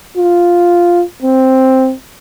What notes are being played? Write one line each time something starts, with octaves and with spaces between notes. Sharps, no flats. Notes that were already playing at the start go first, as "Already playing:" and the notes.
F4
C4